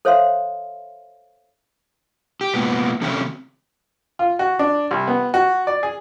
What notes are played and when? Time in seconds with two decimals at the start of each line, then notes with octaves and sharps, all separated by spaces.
0.05 A4 C5 C#5 E5 F5 C6
2.41 G4
2.54 A#2 G#3 B3
3.02 C3 D#3 F#3 A3 C4 C#4
4.19 F4
4.39 F#4
4.59 D4
4.91 C2
5.08 B3
5.34 F#4
5.67 D5
5.83 G#4